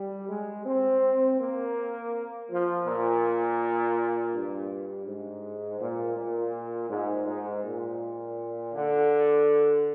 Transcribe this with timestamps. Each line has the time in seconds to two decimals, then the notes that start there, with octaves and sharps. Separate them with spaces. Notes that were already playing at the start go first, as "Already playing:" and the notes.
Already playing: G3
0.29 G#3
0.66 C4
1.39 A#3
2.50 F3
2.86 A#2
4.33 G2
5.07 G#2
5.81 A#2
6.17 A#2
6.90 G#2
7.27 G#2
7.64 A#2
8.74 D3